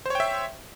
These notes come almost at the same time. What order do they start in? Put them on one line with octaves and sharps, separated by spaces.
C5 C#5 G5 E5